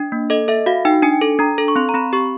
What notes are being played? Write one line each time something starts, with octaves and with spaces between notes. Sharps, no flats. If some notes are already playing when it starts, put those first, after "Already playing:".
Already playing: D4
A#3
A4 D#5
A4 E5
F#4 F5
D#4 G5
D4 G#5
A4
D4 A#5
A4
C#6
C4 C6
A#5
C4 B5
G4 C#6